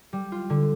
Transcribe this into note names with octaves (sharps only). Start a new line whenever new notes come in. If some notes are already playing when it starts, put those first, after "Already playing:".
G3
F4
D3